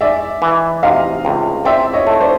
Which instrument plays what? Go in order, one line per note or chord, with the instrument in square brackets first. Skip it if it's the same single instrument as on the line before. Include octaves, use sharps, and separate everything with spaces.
[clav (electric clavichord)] G#3 [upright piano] D5 E5
[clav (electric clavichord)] E3
[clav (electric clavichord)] C3 [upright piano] D#5 F5
[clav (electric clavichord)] C#2
[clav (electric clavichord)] C4 [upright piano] D5 E5
[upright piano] C#5 D#5
[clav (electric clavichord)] A3
[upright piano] C5 D5